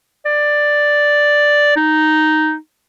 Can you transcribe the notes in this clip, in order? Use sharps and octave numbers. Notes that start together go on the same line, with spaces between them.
D5
D#4